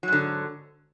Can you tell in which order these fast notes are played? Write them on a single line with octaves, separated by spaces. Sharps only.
F#3 G#2 D3